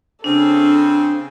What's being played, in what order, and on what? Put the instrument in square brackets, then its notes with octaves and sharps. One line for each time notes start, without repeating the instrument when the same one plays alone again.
[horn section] C#3 C4 [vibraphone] D4 [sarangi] A4